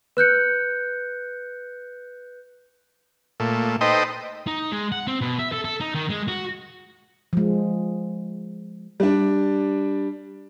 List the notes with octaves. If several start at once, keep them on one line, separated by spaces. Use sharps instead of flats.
B4 F#6 G6 C#7
A#2 A3
D#4 A4 B4 C5 D#5 G5
D#4
G#3
F#5
C4
B2
E5
A4
A4
D#4
D#3
G#3
F#4
F3 G#3
G3 D4